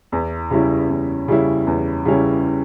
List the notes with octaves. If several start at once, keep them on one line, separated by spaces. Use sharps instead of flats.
E2
C#3 G3 C#4 E4
E2
C#3 G3 C#4 E4
E2
C#3 G3 C#4 E4